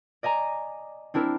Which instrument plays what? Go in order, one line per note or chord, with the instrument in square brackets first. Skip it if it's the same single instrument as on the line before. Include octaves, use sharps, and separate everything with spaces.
[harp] D5 D#5 G#5 A#5
C4 D4 E4 A#4